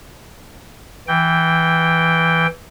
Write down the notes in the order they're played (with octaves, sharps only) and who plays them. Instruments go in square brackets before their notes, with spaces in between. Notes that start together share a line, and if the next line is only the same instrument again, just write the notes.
[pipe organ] E3 G5